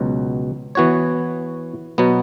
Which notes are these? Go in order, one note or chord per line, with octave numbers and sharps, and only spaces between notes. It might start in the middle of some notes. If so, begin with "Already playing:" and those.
Already playing: C#2 B2 F#3
E3 B3 F#4 C#5
B2 F#3 B3